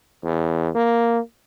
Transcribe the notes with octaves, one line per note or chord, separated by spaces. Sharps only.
E2
A#3